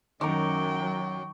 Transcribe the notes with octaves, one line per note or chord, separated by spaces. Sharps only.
F#2 D#3 F#3 G5 A#5 C#6 D6